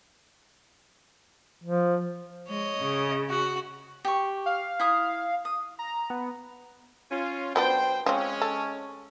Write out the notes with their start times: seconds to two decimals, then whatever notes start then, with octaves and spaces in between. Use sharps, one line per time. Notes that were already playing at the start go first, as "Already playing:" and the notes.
1.64 F3
2.48 G#3 C#5 D#5
2.79 C#3
3.29 F#4 F#5
4.05 G4 C#6
4.46 F5
4.80 E4 D#6
5.45 D#6
5.79 A#5
6.10 B3
7.11 C#4 F4
7.56 F#3 B3 D4 C5 G5
8.06 F3 G#3 C4 C#4
8.42 A4